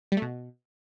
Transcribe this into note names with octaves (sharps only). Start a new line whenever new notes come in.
G3
A3
B2